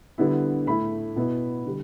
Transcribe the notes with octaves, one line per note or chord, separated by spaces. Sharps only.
D3 G3 B3 E4
A2 A3 E4 B5
B2 B3 E4
D3 G3